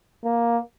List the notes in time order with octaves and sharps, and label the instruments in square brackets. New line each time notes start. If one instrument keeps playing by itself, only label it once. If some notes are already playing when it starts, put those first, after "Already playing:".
[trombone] A#3